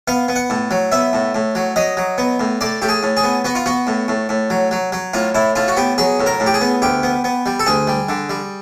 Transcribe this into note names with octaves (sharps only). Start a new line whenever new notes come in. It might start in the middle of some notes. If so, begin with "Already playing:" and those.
B3 F5
B3
F#5
A2
F#3
B3 E5
A2
A2
F#3
F#3 D#5
F#3
B3
A2
A2 D5
A2 G4
G#4
A2
G#4
B3
B3 F#4
F4
B3 F#4
A2
A2
A2
F#3
F#3
F#3
A2 F4
A2 E4
A2 F4
F#4
B3 G4
F#3 G#4
A2
A#4
A2
G4
G#4
B3
D2 G4
B3
B3
G3
A4
D2 G#4
G3
D3
G3